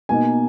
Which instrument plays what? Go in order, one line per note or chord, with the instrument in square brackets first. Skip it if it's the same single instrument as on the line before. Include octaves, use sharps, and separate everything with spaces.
[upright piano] B2 A#3 D#4 G#5